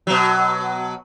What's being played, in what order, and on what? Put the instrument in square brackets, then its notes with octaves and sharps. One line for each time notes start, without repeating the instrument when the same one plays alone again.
[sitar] B2 F#3